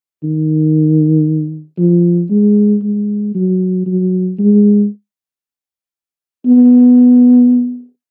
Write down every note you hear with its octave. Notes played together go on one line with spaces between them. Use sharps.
D#3
F3
G#3
G#3
F#3
F#3
G#3
B3